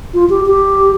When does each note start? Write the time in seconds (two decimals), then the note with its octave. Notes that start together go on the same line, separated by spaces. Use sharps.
0.14 F4
0.30 G4
0.47 G4